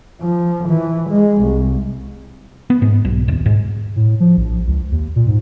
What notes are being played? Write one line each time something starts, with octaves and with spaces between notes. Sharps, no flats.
F3
E3
G#3
C2
B3
G#2
B1
D#1
G#2
A2
F3
A#1
C#2
D#2
A#2
G#2